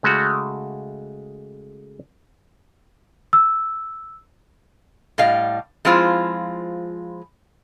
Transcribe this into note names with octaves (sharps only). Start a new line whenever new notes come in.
C#3 G#3 A3 F#4
E6
A2 G3 D#5 F5
F3 G#3 C4 E4 F4 C5